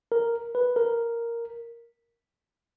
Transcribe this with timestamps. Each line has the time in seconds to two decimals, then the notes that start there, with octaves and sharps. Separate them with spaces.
0.12 A#4
0.55 B4
0.76 A#4